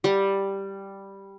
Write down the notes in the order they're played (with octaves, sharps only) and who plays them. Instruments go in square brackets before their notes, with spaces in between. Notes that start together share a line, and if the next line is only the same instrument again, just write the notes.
[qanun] G3